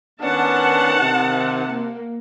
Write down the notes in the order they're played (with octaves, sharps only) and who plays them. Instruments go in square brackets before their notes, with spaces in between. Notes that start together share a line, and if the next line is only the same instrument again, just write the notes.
[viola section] D#3 F#5 A5 [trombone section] B3 C#4 D4
[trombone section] C3
[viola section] A#3